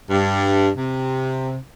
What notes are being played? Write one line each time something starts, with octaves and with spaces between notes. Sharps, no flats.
G2
C3